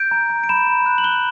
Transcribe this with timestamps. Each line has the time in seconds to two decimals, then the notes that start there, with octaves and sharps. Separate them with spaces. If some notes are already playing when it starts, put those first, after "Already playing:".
Already playing: G6 D7
0.11 A#5
0.30 A#5
0.44 D7
0.49 B5 E7
0.67 B5
0.86 F#6
0.98 F#7
1.03 F#6 G7